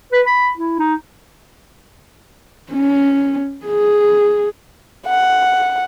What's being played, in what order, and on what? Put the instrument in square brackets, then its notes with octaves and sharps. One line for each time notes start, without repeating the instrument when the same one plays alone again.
[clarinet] B4
B5
E4
D#4
[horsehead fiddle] C#4
G#4
[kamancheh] F#5